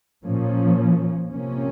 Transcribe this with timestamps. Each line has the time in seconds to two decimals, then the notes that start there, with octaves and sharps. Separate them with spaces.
0.24 A#2 F3 A#3 C#4
1.31 C3 F3 A#3 C#4